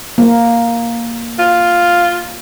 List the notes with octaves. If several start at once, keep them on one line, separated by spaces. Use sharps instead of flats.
A#3
F4